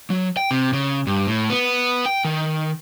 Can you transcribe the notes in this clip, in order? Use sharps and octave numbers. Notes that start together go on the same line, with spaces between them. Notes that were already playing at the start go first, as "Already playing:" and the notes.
F#3
G5
C3
C#3
G2
A2
B3
G5
D#3